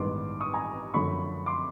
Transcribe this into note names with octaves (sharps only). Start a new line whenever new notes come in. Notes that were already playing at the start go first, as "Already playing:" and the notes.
Already playing: A1 G2 D#3 G#3 B3 C6 D6
C#6 D#6
G#5 A#5
F#2 D3 F3 A3 B5 C#6
C6 D6